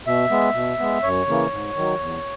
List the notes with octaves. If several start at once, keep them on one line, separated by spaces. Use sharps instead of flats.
B2 E5
G#3 B3
B2
G#3 B3
F#2 C#5
C#3 E3 A#3
G#2
D#3 F#3
E2